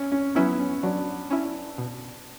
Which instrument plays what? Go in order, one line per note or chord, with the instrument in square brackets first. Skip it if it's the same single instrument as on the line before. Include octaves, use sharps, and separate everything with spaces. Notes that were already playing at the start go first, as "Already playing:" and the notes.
Already playing: [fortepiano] C#4
C#4
[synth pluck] F#3 C#4 E4 [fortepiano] B3
[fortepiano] C#4
[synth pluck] F#3 [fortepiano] D4
[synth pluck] C#4 E4
B2